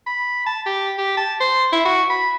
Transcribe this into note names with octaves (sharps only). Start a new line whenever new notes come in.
B5
A5
G4
G4
A5
C5
E4
F#4
B5